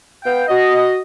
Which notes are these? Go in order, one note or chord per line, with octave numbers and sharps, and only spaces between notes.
B3 F5 G5
F#4 D#5